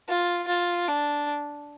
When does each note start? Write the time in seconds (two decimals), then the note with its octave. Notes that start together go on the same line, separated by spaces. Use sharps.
0.09 F4
0.47 F4
0.88 D4